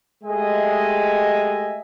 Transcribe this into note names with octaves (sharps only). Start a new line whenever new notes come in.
G#3 A3 G4 D#5 E5 G#5